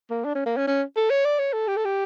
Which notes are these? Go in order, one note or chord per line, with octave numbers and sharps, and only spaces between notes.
A#3
D4
C#4
A#3
C#4
C#4
A4
C#5
D5
C#5
A4
G4
A4
G4